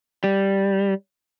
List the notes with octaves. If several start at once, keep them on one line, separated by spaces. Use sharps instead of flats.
G3